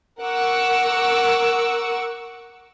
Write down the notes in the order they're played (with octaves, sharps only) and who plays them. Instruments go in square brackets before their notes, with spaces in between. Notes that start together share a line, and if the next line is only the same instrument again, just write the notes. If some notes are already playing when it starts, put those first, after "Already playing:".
[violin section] A#4 F#5 C#6 D6 E6